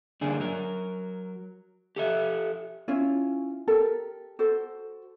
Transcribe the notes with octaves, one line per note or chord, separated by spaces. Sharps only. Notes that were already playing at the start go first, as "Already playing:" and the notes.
G2 D3 A#3 D4 G#4
F#3 A#4
G4 A4 E5
C#4 E4 F4 C#5
G4 A4 A#4
F#4 A4 C5